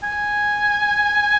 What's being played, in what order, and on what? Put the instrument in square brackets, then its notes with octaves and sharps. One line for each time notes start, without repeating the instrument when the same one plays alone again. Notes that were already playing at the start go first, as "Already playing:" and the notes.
[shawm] G#5